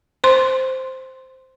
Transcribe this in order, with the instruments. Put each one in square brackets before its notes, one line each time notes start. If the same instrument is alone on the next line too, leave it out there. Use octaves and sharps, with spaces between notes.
[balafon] C5 C6